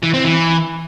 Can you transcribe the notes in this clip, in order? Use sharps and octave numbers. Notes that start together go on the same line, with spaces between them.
E3
C4
E3